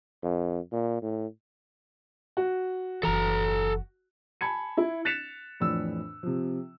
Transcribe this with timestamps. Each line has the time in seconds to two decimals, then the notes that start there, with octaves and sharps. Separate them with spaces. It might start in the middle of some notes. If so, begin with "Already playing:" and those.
0.23 F2
0.72 A#2
1.02 A2
2.37 F#4
3.03 F#1 E3 A4 A#5
4.41 G#5 A5 B5 G#6 C#7
4.77 E4
5.05 F#6 A6 B6 C#7 E7 F7
5.60 F2 A2 E3 D4 E6
6.23 C3 F3